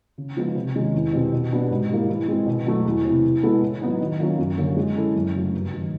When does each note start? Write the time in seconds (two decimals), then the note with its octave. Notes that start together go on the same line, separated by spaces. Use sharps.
0.18 C#3
0.37 F3 G#3 B3 D#4
0.56 C3
0.75 D#3 G#3 C#4
0.94 E2
1.13 B2 G3 C4
1.32 B2
1.52 G3 B3 D4 F#4
1.71 G#2
1.89 E3 G3 A#3
2.09 E3
2.28 G#3 C4
2.47 B2
2.66 F#3 A3
2.85 E2
3.05 C3 E3
3.24 E3
3.43 G#3 B3 E4 A4
3.62 A2
3.81 F#3 B3 D#4
4.00 D#3
4.20 F#3 A#3 C#4 F4
4.39 F#2
4.58 D3 G3 A#3 C#4
4.77 G#3
4.96 C#4 E4 A4
5.15 F#2
5.34 C#3 F#3 A3
5.53 G2
5.73 D#3 F#3